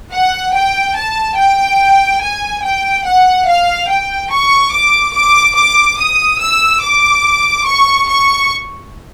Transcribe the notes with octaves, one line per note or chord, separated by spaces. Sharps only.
F#5
G5
A5
G5
G#5
G5
F#5
F5
G5
C#6
D6
D6
D6
D#6
E6
D6
C#6
C#6